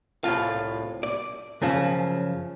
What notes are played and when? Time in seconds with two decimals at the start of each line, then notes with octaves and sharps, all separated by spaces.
0.24 C2 A2 F4 F5
1.03 D5
1.62 F#2 C#3 F3